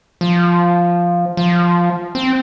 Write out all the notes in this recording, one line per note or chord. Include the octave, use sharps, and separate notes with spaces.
F3
F3
C4